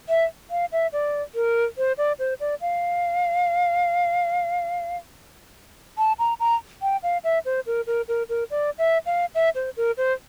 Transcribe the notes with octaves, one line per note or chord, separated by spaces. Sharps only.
E5
F5
E5
D5
A#4
C5
D5
C5
D5
F5
A5
A#5
A#5
G5
F5
E5
C5
A#4
A#4
A#4
A#4
D5
E5
F5
E5
C5
A#4
C5